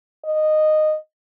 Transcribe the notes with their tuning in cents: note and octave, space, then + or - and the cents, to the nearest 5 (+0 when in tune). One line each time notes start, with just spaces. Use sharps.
D#5 -15